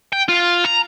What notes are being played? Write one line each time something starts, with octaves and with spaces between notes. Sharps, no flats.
G5
F4
A#5